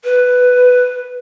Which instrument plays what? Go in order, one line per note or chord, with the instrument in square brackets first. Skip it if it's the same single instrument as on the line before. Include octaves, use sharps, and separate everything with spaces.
[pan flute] B4